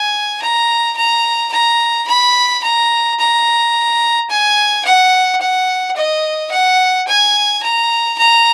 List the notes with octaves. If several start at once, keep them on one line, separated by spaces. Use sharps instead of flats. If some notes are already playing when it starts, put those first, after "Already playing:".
Already playing: G#5
A#5
A#5
A#5
B5
A#5
A#5
G#5
F#5
F#5
D#5
F#5
G#5
A#5
A#5